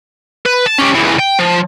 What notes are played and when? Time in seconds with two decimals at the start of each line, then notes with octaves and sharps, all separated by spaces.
0.46 B4
0.66 A5
0.79 C#4 G4
0.95 C#2 E3
1.19 G5
1.39 F3